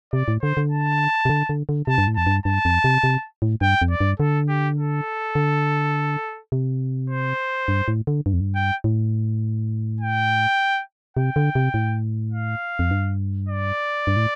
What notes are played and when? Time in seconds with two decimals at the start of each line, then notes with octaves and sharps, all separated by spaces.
0.13 C3 D5
0.28 A2
0.42 D3 C5
0.57 D3
0.71 A5
1.25 C3
1.29 D3
1.49 D3
1.69 D3
1.87 C3 A5
1.98 G2
2.07 A2
2.16 F2 A5
2.26 G2
2.45 G2 A5
2.65 F2
2.84 C3
3.04 C3
3.42 A2
3.61 G2 G5
3.82 F2
3.91 D5
4.01 G2
4.20 D3 A4
4.49 G4
4.78 A4
5.35 D3
6.52 C3
7.10 C5
7.68 G2
7.88 A2
8.07 D3
8.26 G2
8.33 F2
8.41 G2
8.56 G5
8.84 A2
10.01 G5
11.17 C3 G5
11.36 D3
11.55 C3
11.74 A2
12.32 F5
12.79 F2
12.91 G2
13.49 D5
14.07 G2
14.16 A2